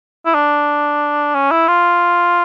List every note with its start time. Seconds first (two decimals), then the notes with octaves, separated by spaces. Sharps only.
0.26 E4
0.35 D4
1.34 C#4
1.51 E4
1.68 F4